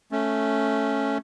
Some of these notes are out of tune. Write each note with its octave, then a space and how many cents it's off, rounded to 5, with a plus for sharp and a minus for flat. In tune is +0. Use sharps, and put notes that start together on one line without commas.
A3 +0 C#4 +0